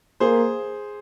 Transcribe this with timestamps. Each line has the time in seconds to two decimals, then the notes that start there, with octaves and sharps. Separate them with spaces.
0.20 A#3 G#4 C5